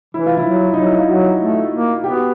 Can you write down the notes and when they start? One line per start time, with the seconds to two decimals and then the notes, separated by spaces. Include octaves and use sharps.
0.14 E3 E4
0.26 F4
0.37 E4
0.46 F#3
0.73 F#3 D#4
0.86 E4
0.98 F4
1.09 F#3 F#4
1.41 A3
1.73 A#3
2.04 B3 G4
2.13 F#4